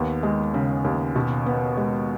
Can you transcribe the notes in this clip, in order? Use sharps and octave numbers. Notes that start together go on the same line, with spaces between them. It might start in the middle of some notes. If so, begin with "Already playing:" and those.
Already playing: D#2 D#3 B3
G#3
C#3
D#2
B2
B3
G#3